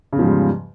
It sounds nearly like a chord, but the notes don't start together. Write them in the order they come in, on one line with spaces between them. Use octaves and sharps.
C#3 E2 F3 G#2 G3